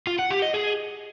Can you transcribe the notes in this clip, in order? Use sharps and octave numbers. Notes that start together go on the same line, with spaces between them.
F4
F#5
G4
D#5
G#4